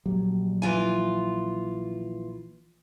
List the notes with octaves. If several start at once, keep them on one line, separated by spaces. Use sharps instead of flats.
A#1 F#3 G3
E3 F4 G#5